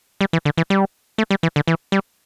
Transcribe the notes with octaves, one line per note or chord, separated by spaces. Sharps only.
G3
E3
D3
E3
G3
A3
G3
E3
D3
E3
G3